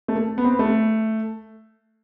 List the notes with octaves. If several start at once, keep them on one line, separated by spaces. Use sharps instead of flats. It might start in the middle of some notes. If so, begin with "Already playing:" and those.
A3
A#3
B3
C4
B3
A3